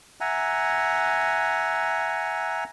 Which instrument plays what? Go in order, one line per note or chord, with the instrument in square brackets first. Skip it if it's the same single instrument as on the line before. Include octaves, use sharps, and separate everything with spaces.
[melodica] E5 F#5 G#5 A#5